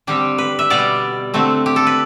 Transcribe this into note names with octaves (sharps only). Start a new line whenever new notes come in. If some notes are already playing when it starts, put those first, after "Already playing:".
D3 G3 C4 G4
B4
E5
B2 G3 B3 D5
D3 A3 C4
G4
A4
B4